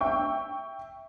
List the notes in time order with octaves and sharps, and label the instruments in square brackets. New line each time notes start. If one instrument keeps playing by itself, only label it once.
[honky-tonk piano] E5 G5 C#6